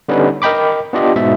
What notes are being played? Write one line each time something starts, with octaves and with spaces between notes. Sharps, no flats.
D3 G3 B3 C#4 D#4 B4
A#4 D#5 G5 B5 D6
B3 D4 F4 G4 D#5
G#2 B2 E5